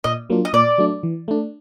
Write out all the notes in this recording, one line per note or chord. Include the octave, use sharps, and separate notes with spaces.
A#2 D#5
F#3 A#3 D4 F4
D#5
A#2 D5
F#3 A3 D4
E3
A3 D4